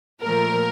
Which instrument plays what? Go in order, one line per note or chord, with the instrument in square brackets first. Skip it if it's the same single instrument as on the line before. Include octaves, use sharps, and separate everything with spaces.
[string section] A#2 F3 A3 A#4